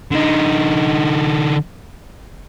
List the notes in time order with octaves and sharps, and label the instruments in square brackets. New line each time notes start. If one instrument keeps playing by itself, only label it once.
[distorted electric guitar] D3 D#4